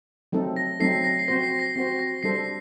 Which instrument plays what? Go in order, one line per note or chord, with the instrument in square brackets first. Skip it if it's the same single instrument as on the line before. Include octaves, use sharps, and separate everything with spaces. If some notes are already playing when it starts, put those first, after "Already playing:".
[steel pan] F#3 A3 C4 D#4 A4
[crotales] A#6
[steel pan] F#3 A3 C4 D#4 A4 [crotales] C7
[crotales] A#6
C7
[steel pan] C4 F#4 C5 [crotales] A#6
[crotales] C7
A#6
[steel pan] C4 F#4 C5 [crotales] C7
[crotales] A#6
[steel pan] G3 D4 A4 C5 [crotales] C7